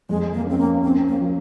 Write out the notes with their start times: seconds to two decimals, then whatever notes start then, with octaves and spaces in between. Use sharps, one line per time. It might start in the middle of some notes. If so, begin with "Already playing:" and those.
0.09 F2 G#3
0.33 A#3
0.47 C4 C#4
0.58 A#3
0.83 C4 C#4
1.08 A#3
1.21 F3